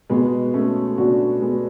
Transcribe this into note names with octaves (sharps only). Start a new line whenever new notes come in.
B2 G#3 B3
A3 C#4
B2 D4 F#4
G#3 B3